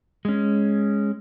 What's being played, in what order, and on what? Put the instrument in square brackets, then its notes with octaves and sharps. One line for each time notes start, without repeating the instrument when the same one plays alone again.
[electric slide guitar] G#3 C#4